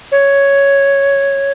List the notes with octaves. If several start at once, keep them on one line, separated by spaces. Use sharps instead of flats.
C#5